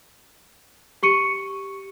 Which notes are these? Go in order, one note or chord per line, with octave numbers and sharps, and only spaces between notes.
G4 C#6 C#7 D#7